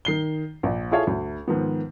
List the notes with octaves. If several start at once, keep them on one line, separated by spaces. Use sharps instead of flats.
D#3 C7 G7
A#1
E4 F4 G#4 A4 C#5 F5
D2
G#2 D#3 F3 B3